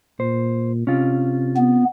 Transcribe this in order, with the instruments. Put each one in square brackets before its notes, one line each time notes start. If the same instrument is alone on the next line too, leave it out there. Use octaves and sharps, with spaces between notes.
[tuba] A#2 [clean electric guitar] C5
[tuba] C3 [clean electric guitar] C#4 F4
[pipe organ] B3